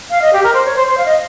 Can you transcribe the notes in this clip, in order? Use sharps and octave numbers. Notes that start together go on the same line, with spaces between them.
F5
D#5
G4
A#4
C5
C#5
C5
C5
F5
D#5